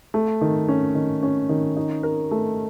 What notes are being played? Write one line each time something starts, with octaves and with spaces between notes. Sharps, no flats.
A3
D#3
C#4
D#3
C#4
D#3
D#4
A#4
A3